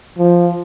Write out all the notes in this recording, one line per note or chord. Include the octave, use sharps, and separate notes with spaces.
F3